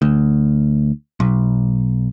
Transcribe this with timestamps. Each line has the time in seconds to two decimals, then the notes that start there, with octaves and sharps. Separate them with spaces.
0.02 D2
1.20 B1